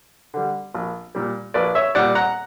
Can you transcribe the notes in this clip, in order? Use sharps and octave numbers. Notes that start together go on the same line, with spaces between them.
D3 G3
A#1
A#2 G3
A#1 B4 D5
C#5 E5
A#2 G3 D5 F#5
F#5 A#5